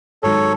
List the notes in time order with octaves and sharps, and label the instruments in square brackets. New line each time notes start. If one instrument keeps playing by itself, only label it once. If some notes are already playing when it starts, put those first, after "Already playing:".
[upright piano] G#1 G#2 F#3 [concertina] A4 C#5